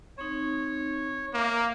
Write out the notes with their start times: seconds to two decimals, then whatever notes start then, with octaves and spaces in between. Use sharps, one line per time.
0.18 C4 D#4 C#5
1.34 A#3 E5